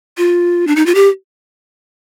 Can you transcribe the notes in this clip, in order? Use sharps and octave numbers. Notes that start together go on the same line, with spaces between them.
F4
D4
D#4
F4
G4